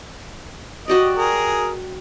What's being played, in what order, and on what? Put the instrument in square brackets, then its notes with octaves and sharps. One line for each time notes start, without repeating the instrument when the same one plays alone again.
[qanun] F#4 G4 D5 [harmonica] D#5
[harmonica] G#4 A#4